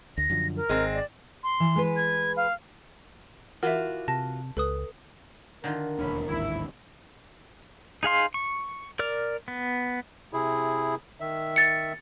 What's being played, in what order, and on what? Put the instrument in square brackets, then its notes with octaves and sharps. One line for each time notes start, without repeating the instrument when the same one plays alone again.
[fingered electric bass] D2 [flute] A#6
[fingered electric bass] F#2 D3 F3
[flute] A#4
[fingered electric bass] G#1 [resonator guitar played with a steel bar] G#3 C4
[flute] D5
[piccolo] C6
[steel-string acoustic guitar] E3
G#3 B4
[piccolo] G#6
F5
[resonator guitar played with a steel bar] E3 F4 F#4 [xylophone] A#4 E5
[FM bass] C3 [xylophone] A5 A#6
[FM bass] C#2 [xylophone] A4 B4 D#6
[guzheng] D3 D#3 F4 [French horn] A#4
[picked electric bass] E1 D#2 D4 [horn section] A2 C#4 B5
[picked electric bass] A1 D#2 G#2 [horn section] E4
[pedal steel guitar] D#4 G#4 F5 C6
C#6
A#4 D5 F6
B3
[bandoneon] C3 E4 G#4
D#3 E5
[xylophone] A6 C#7